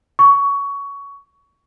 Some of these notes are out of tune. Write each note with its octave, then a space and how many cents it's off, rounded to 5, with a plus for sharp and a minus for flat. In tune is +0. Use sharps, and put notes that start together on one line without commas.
C#6 +15